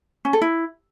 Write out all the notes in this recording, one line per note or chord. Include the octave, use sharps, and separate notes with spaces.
C#4
A4
E4